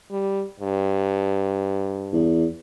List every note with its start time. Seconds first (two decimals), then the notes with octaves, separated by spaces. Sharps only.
0.11 G3
0.60 G2
2.13 E2